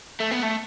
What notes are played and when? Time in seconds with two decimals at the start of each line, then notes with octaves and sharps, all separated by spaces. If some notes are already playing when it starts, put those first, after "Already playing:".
0.20 A3
0.31 B3
0.43 A3